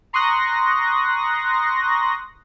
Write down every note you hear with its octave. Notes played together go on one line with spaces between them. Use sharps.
A#5 C6 C#6 D#6 F#6 A#6